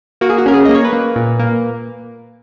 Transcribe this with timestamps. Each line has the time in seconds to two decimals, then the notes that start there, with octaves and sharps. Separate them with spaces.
0.21 A#3 F#4
0.30 G#4
0.38 F#4
0.46 C#4 A#4
0.53 G#4
0.65 A#3 D#5
0.74 C#5
0.84 B4
0.93 A#3
1.16 A#2
1.39 A#3